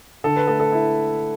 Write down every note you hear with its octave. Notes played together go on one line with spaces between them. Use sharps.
D3 A4
B4
A3 A4
A4
E4